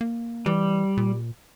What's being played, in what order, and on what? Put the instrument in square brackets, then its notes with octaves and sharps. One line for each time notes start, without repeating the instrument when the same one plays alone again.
[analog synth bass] A#3
[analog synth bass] E3 [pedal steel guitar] G3
[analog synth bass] A#2